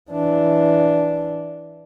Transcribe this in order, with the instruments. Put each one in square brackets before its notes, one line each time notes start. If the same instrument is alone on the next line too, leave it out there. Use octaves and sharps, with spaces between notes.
[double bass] E3 D4